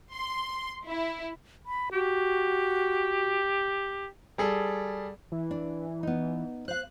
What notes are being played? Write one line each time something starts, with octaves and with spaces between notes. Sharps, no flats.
C6
E4
B5
F#4 G4
G3 G#4 A4
E3
D4
B3 D#4
C5 F5 F#6